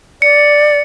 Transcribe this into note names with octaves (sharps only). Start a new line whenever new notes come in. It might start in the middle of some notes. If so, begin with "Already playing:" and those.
D5 C#7